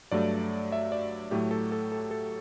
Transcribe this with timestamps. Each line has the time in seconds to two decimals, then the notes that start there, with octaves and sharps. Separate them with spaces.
0.11 G2 F#3 A3 D5
0.72 E5
0.92 D5
1.31 A2 F#3 A3 G4
1.51 A4
1.72 A4
1.92 A4
2.11 A4